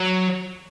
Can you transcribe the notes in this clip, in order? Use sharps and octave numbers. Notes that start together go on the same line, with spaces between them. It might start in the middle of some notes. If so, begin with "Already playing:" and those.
Already playing: F#3